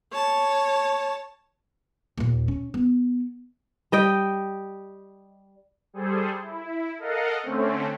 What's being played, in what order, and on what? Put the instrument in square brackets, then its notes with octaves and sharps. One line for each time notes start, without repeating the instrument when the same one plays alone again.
[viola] C#5 A5
[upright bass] D#2 A#2
C#4
B3
[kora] G3 D#5 G5
[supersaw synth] G3 G#4 A4 C5
E4
A4 A#4 D#5 F5 F#5
D3 A3 C4 C#4